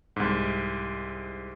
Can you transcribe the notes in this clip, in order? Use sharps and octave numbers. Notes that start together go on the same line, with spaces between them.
C2 G#2